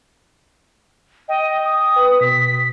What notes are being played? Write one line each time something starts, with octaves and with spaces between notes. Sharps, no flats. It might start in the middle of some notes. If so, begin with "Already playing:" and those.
D#5 G5
D#6
B4
B2 B6